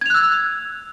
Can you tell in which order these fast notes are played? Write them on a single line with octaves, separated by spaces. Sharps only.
G#6 F7 F#6 E6